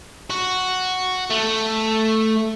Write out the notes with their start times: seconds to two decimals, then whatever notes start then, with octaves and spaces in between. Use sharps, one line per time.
0.30 F#4
1.30 A3